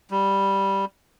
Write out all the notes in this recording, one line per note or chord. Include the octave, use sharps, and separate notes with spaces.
G3